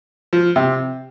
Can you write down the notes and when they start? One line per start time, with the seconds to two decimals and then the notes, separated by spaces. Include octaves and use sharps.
0.33 F3
0.56 C3